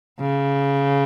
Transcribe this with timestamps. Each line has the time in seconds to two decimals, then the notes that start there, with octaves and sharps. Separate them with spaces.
0.20 C#3